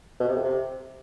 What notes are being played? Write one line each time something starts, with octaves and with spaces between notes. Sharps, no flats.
B2
C3
F2
C3